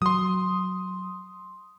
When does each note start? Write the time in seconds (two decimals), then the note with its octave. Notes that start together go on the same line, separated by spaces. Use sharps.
0.02 F#3 C6 D#6